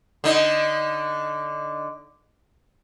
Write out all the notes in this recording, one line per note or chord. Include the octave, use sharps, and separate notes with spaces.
D3 D#4